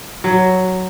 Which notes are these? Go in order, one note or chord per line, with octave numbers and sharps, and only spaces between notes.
F#3